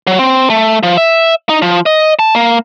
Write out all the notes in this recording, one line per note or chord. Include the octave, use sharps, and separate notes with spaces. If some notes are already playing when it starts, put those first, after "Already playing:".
F#3
C4
A3
F3
E5
D#4
F3
D#5
A5
A#3